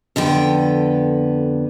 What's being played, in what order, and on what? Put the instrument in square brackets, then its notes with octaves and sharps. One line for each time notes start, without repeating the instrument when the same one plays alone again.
[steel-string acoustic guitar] F2 D3 B3 G5